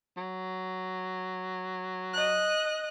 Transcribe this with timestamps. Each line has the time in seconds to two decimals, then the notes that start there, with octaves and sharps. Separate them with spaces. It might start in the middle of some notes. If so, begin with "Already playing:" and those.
0.17 F#3
2.13 D#5 F#6